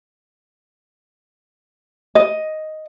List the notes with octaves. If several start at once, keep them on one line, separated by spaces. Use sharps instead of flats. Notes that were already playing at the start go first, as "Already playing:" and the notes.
D#5